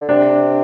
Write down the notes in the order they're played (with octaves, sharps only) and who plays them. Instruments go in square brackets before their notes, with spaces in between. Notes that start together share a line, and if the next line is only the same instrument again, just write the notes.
[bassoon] D3
[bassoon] C3 [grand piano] D4